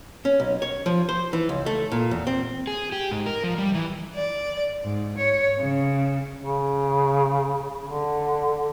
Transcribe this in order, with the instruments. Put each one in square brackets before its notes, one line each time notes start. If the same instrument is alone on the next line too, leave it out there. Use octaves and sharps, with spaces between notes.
[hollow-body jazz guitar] C#4
B1
C#5
F3
C5
E3
C#2
A3
A#2
E2
C4
[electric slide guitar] G#4
G4
G#2
A#4
F3
G3
E3
[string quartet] D5
G#2
C#5
C#3
[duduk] C#3
D3